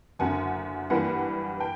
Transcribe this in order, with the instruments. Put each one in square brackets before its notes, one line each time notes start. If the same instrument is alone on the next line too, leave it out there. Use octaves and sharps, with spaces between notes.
[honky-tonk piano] F#1 F#2 D3 F#5 G#5
G2 E3 G3 A#3 F#5 G#5
G5